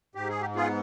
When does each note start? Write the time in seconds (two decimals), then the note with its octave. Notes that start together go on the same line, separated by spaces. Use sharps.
0.15 G#2 G4
0.29 G#4
0.41 G4
0.56 B3 F4 G#4